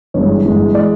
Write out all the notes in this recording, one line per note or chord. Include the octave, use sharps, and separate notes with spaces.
G1 G2 E3 G#3 C#5
G1 G2 E3 G#3
E3 G#3 D5